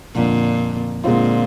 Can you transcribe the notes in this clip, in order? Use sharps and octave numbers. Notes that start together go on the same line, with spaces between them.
F2 A#2 D3 F3
A#2 D3 G#3 C4 F4